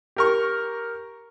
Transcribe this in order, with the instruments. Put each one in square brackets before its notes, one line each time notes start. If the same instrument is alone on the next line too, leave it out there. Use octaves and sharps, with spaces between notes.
[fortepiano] G4 A#4 C#6